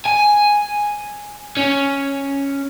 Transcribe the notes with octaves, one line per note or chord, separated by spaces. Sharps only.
G#5
C#4